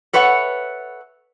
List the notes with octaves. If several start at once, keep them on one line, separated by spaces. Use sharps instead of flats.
A4 B4 C#5 E5 F#5